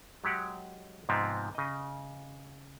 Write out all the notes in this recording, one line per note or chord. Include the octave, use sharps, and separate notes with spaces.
F#3 G#3 G4 F#5
G#2 C3 F3 B3 C4
C#3 D#5